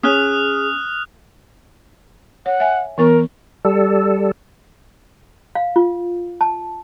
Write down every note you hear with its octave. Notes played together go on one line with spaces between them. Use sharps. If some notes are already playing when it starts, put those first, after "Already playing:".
C#4 G#4 D#6 F6 F#6
C#5 F#5
E5 G#5
E3 B3 A#4 C#6
G3 A4
F5
F4
A5